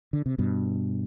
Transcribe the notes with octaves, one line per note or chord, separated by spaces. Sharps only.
D3
C3
G2 B2